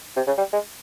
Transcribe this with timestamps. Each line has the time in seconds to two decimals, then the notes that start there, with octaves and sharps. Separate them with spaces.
0.16 C3
0.27 C#3
0.38 G3
0.53 G#3